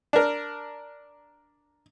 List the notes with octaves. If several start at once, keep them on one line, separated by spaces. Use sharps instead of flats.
D4 A#4